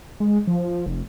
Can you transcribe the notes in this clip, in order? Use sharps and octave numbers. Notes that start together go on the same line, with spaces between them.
G#3
F3
F1